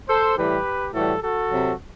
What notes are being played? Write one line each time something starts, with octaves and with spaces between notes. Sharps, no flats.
A4 C5
A2 E3 G3 G4 B4
A2 E3 G3 F#4 A4
F#4 A4
C3 F#3